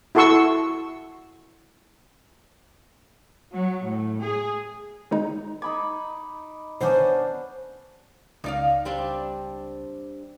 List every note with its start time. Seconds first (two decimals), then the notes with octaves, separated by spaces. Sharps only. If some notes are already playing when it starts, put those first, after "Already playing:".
0.15 E4 F#4 A4 C6 C#6 E6
3.52 F#3
3.84 A2
4.23 G#4
5.11 D#3 G#3 D#4
5.62 D#4 B5 D6 G#6
6.81 B1 D#3 B3 C#4 D4 C5 D#7
8.44 C#2 D#4 D5 F5
8.85 G3 C4 D4